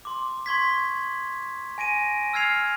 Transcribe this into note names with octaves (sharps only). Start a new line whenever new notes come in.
C6 D6
C6 C#6 G#6 B6
G#5 A#6 D7 D#7
E6 F6 G#6 C7 F7